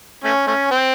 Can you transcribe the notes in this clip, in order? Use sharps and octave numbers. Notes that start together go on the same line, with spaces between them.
A3 C#4
A3 C#4
C4